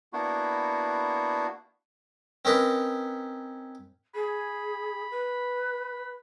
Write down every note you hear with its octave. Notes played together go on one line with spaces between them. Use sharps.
A#3 B3 D4 E4 F#4
C4 C#4 D#4 A#4 B4
G#4 B5
B4